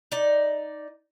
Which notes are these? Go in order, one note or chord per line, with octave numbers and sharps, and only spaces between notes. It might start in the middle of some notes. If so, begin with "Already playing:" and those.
D#4 D5